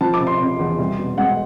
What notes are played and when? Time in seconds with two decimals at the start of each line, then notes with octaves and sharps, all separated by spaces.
0.01 F3 A5
0.14 D6
0.20 C3
0.27 C6
0.40 C3
0.59 E2
0.78 C2
0.99 B2
1.17 G#3 F#5